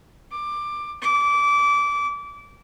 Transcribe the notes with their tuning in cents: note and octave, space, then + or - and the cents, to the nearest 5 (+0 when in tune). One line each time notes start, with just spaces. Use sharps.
D6 +15
D6 -25